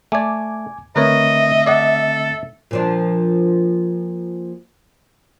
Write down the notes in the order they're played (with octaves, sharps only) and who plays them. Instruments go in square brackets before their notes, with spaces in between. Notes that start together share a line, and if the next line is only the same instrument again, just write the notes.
[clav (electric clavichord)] A3 D5 [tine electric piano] G#5 D6 G#6
[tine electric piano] D3 A3 C4 [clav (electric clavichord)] A#4 B4 C#5 [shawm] D#5 [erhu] E5
[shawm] A4 [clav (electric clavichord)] D5 D#5 F#5
[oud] A#2 F3 D4